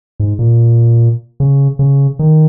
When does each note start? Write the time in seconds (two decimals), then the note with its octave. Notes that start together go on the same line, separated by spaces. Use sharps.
0.20 G#2
0.39 A#2
1.40 C#3
1.79 C#3
2.19 D#3